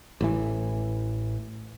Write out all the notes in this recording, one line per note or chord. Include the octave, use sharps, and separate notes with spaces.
A1 A2 E3